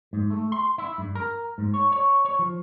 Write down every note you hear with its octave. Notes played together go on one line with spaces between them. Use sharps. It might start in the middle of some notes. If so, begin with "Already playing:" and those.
G#2
A3
C6
E4
G2
A#4
G#2
C#5
C#5
C#5
F3